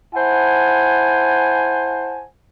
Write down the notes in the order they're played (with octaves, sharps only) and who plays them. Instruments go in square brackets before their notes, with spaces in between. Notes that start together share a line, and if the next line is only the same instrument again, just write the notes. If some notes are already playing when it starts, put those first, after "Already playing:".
[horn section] E4 C5 F#5 G#5 A5